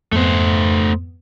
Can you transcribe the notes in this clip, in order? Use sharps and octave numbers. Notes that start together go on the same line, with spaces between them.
F2 G#2 A3 B3 C5